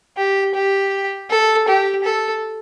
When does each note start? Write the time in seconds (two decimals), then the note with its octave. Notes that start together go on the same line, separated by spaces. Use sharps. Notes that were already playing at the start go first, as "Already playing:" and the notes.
0.17 G4
0.54 G4
1.30 A4
1.68 G4
2.04 A4